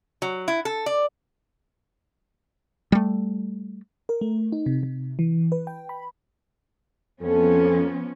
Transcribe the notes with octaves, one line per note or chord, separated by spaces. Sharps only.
F#3
E4
A4
D5
G3 A3
A#4
A3
D#4
C3
C3
E3
B4
G5
B5
F2 F3 B3 C#4 A4